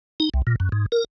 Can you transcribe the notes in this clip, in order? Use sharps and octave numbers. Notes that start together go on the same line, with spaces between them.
D#4
C2
A#2
F#2
G#2
A#4